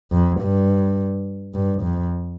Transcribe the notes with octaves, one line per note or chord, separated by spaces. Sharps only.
F2
G2
G2
F2